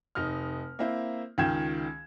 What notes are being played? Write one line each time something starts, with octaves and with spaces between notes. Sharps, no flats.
F1 D#4 F6
A#3 C4 E4 C5
C#2 D#3 F4 G5 G#6 E7